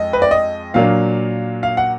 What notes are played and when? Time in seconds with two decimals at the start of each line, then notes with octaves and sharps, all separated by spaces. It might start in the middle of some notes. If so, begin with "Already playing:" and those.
Already playing: F2 G#3 D#5
0.13 B4
0.22 D5
0.31 D#5
0.74 A#2 F#3 A#3 D4 F5
1.63 F5
1.77 F#5